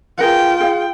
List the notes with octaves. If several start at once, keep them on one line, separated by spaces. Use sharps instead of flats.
F4 G#4 A#4 B4 G5
G#4 F5